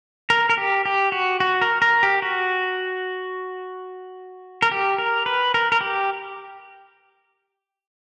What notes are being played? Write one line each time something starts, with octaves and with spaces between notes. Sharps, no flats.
A#4
A#4
G4
G4
F#4
F#4
A#4
A#4
G4
F#4
A#4
G4
A#4
B4
A#4
A#4
G4